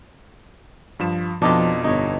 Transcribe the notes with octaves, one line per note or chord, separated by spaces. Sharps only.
G2 F3 E7
F2 B2 F3 D4 D#4 F4
G1 D#4 C#5